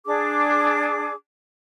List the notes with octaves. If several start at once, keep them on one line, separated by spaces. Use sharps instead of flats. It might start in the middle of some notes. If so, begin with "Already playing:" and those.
D4 G#4 D6